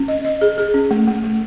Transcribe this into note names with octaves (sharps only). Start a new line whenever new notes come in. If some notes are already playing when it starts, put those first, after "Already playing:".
Already playing: C#4
D#5
D#5
G#4
G#4
C#4
A3
A3
A3